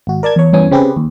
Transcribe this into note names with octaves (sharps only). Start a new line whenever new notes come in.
G#1 F#4
A#4 D5 A5 G#6
E2 C#5
E2 G2 E3 C#4 C#5 G#5
C#3 C4 G4 G#4 B4
D#2